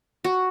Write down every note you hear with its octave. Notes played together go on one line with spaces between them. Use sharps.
F#4